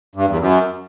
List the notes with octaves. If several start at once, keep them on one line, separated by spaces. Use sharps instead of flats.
G2
E2
F#2